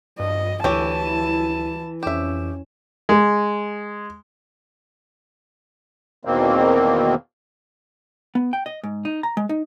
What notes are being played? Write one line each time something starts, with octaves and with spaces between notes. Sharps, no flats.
G2 D#5
D2 E3 E4 G4 C#5 G5 A5 D#7
F2 C#4 G4 E5 E7
G#3
E2 B2 D#3 A#3 C4
B3
G5
D#5
G#2
D#4
A#5
G#3
D#4